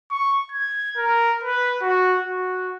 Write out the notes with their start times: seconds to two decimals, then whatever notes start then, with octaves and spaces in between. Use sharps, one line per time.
0.11 C#6
0.52 G#6
0.97 A#4
1.44 B4
1.82 F#4
2.21 F#4